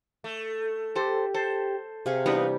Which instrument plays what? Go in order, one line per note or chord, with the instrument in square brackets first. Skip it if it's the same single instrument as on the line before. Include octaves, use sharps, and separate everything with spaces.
[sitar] A3
[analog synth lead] G4 [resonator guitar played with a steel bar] A4 C5
[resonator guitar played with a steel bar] A4 [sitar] C5
[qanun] C3 G#4 C#6 [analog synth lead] F5
[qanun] E3 G3 [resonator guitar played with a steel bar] B3 D#4 B4 [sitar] D4